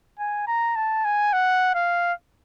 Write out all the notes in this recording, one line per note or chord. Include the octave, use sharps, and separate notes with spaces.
G#5
A#5
A5
G#5
F#5
F5